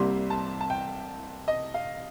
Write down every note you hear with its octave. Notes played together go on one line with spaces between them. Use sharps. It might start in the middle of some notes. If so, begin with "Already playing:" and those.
Already playing: C2 C3 G3 A#3 C6
A5
A5
G5
D#5
F5